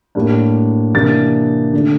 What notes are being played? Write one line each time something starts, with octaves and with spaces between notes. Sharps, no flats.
A2 G3 A#3 D4
C3 E3 A#3 D4 A6
D3 A3 D4